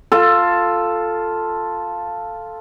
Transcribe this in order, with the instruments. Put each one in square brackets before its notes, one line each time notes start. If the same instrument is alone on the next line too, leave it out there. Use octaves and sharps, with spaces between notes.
[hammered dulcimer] F4 A4